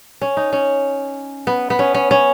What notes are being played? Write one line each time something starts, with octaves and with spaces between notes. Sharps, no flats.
C#4
D#4
C#4
B3
B3
C#4
C#4
C#4